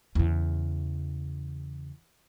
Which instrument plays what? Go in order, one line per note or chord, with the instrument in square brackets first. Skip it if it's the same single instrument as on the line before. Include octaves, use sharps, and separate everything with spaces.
[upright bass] E2 C#3